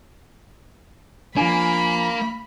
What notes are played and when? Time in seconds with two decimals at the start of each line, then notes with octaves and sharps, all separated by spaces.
1.37 F3 A#3 D4 G#5 B5